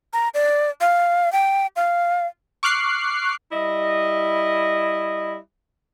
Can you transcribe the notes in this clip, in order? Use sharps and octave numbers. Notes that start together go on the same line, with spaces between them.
A#5
D5
F5
G5
F5
C#6 D6 F6 F#6 C7
G3 E4 D#5